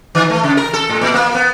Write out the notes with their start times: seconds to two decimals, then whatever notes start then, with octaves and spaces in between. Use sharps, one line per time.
0.15 D#3
0.30 A3
0.43 C#3
0.57 A#4
0.73 A4
0.89 A2
1.01 A#2
1.14 A#3
1.35 B3